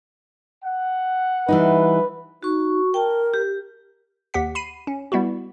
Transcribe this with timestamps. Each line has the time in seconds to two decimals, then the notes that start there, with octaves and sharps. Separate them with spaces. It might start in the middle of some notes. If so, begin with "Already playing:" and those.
0.63 F#5
1.48 E3 G3 D#4 B4
2.43 D#4 F#4 C#6
2.94 A#4 G5 A5
3.34 G4
4.34 D#2 G4 F#5 B6
4.55 B5 C7 D#7
4.87 C#4
5.12 G3 B3 E4 F#4